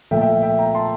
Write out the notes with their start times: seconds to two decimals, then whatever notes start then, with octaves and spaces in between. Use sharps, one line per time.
0.11 A#2 F3 A3 E5 G5
0.21 E5 G5
0.42 E5 G5
0.58 G5 A#5
0.75 A5 C6